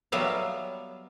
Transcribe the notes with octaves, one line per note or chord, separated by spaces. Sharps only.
F#3 G3 B3 E5 F5